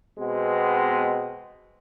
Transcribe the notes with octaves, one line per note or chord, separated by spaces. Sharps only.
B2 G#3 B3 C4